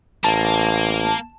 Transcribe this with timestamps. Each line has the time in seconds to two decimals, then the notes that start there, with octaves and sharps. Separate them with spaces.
0.24 A1 A#3 A5